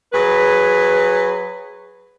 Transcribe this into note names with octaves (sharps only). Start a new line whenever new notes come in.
F#3 G#4 B4